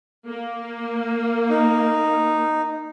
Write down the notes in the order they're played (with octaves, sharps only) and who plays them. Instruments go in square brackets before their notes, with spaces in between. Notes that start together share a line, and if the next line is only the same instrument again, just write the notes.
[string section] A#3
[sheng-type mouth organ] D#4